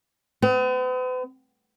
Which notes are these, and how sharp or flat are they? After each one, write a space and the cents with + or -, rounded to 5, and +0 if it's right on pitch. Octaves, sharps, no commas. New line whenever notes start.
B3 +45